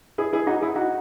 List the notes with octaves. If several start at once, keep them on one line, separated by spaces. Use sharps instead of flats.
E4 G#4
E4 G#4
D#4 F#4
E4 G#4
D#4 F#4